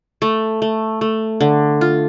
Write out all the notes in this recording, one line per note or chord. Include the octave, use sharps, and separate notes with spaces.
A3
A3
A3
D3
F4